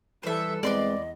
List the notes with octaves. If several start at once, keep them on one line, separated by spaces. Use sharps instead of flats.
E3 G3 A4 B4 C5 E5
E2 G#3 C4 B4 D5 D#5 C6 D6